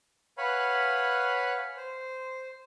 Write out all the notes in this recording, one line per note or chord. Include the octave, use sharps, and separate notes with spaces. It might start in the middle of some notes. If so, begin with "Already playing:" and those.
B4 C#5 F5 F#5 G#5 B5
C5